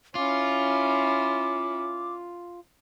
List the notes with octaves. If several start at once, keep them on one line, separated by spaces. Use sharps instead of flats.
C#4 E4 F4 D6